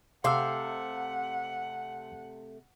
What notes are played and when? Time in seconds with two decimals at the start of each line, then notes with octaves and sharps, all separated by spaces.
0.24 C3 A3 F5 F#5 C6 D6 E6